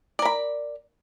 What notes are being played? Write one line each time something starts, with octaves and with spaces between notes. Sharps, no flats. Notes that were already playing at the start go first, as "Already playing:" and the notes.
A#4 D5 B5